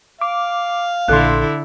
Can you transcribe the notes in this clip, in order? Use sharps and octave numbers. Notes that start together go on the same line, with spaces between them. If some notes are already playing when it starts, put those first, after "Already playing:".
F5 D6
A#1 A#2 D3 E4 A4 C6 F#6